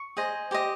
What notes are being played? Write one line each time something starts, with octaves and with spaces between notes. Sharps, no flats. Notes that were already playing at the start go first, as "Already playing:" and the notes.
Already playing: C#6
G#4 C5 D#5
G4 C5 D#5